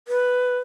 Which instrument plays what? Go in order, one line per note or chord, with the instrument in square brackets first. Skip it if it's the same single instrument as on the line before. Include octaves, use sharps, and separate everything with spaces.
[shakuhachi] B4